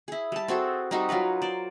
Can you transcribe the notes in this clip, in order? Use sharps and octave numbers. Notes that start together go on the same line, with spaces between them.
E4 G#4
G3 A5
C4 F#4 G#4 A4
G3 C4 D#4 F#4
F#3 F4 A#4 B4
C5 D5